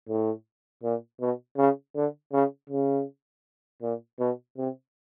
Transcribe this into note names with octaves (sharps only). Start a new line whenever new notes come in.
A2
A#2
B2
C#3
D3
C#3
C#3
A#2
B2
C3